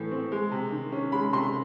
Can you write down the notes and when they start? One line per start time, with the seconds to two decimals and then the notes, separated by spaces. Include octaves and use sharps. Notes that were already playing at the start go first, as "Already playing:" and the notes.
Already playing: A2 E3 A3
0.11 C4
0.32 G#3
0.52 C3
0.72 D#3
0.92 C#4
1.12 G#3 B5
1.33 C3 C6